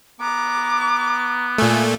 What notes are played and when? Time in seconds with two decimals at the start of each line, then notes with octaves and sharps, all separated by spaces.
0.20 B3 A#5 D6
1.58 A#2 A3 G#5